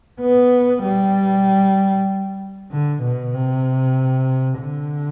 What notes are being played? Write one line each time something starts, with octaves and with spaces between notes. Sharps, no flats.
B3
G3
D3
B2
C3
D3